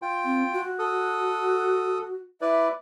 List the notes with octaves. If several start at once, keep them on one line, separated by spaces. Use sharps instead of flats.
F4 G5
C4
F#4
A4 D#6
E4 B4 D5 E5